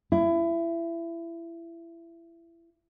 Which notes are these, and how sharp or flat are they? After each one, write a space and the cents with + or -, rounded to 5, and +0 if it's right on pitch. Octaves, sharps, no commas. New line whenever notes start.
E4 +25